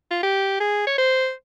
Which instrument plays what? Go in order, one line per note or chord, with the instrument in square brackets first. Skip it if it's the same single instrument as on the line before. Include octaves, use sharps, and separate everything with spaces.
[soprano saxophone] F4
G4
G#4
C#5
C5